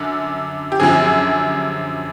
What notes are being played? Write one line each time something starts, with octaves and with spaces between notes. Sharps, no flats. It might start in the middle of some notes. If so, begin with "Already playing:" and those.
Already playing: F#2 D3
G4
F#2 D3 F3 G#4